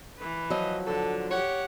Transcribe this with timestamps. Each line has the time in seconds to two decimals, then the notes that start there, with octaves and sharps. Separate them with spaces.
0.18 E3 B4
0.50 F3 F#3 D#5
0.87 D3 A4
1.31 G4 C#5 F#5